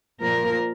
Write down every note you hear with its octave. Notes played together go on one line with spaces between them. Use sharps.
A#2 F3 A#3 A#4